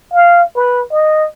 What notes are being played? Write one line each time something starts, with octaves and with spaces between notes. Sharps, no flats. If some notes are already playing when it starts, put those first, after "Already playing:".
F5
B4
D#5